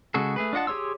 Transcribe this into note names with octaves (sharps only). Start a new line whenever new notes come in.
C#3 G#3 F#4 G#4 A4
A3 G#4 B4
D4 F4 D#5 F#5 A5
G4 G#4 C#5 C6 E6